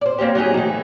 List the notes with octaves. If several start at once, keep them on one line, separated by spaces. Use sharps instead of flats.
C5 D5
A#3 C4 C#4 G4
F#3 D#4 G4 G#4
E3 A3